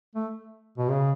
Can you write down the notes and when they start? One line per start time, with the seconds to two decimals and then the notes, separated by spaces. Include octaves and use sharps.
0.15 A3
0.78 B2
0.89 C#3